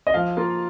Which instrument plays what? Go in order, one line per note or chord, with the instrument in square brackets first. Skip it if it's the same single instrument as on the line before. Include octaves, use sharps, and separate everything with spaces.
[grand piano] D#5
[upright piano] F3 [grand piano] F5
[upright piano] A#3 F4